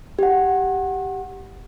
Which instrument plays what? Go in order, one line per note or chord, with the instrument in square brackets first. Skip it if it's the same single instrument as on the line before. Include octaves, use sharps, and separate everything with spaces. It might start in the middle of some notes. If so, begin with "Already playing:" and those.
[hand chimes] G4 F#5